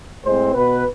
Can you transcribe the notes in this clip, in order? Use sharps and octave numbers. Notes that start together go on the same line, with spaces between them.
A2 G#3 C4 C5
B2 B3 B4